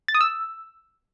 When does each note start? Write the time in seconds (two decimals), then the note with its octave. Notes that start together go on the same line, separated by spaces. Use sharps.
0.08 A6
0.15 D#6
0.21 E6